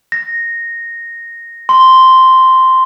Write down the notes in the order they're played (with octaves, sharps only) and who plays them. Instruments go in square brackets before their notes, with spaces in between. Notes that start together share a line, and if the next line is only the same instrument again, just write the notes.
[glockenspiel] A#6
C6